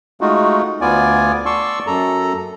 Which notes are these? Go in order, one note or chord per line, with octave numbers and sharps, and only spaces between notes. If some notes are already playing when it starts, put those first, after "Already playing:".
G#3 A3 D#4 F4 F#4
D2 B3 F4 D5 G#5
D5 A5 C6 C#6 E6
F#2 A4 A#5